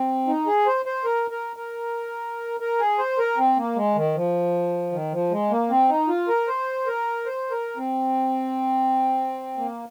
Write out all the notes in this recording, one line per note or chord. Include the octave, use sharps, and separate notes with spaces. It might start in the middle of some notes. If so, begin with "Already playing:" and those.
Already playing: C4
D#4
G#4
C5
C5
A#4
A#4
A#4
A#4
G#4
C5
A#4
C4
A#3
G#3
D#3
F3
D#3
F3
G#3
A#3
C4
D#4
F4
A#4
C5
A#4
C5
A#4
C4
A#3